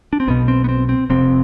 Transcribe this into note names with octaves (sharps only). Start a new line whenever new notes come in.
D4
C4
B1 B2 B3
C4
B3
C4
C4
F1 F2 C3 C4